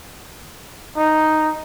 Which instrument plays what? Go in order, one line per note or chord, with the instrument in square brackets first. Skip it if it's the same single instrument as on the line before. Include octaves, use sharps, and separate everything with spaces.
[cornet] D#4